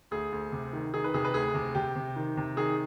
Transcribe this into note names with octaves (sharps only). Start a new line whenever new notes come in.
D2 G#4
D2
C3
D#3
D#3 G#4
B4
C3 G#4
B4
D2 G#4
C3
C3 G4
C3
D#3
C3
D#3 G#4